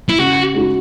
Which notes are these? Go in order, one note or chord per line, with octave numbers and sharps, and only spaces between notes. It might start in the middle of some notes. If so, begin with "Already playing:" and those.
E4
C#3 F#4
G#3 D#4 F#4